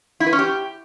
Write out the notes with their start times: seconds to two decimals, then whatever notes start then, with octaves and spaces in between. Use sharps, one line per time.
0.20 E4
0.26 B4
0.33 C#4
0.39 G4